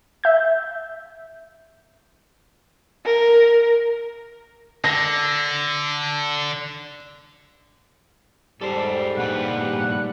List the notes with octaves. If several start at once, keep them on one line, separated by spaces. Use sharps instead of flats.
E5 G6
A#4
D3 A#6
G#2 G3 A4 C5
G2 A#2 B4 F#5